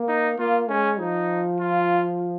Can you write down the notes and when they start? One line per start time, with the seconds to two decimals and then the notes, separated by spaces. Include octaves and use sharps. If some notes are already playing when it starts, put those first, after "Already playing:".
Already playing: A#3
0.08 D#4
0.39 A#3 F4
0.69 G#3 C#4
0.99 F3 D#4
1.60 F4